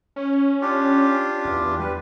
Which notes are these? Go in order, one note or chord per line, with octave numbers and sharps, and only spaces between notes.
C#4
D4 F4 G4
E2
G3 B4